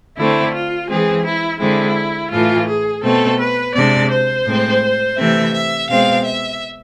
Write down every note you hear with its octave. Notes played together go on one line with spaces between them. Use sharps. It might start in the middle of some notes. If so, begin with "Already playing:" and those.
D3 A3 C4 E4
F4
E3 G#3 C4 G#4
E4
D3 G#3 C4 E4
A2 E3 A3 F4
G#4
B2 A3 C4 A4
B4
C3 G#3 D4 D5
C5
A2 G#3 C4
C3 E3 A3 C4 E5
E5
B2 G#3 C4 F5
E5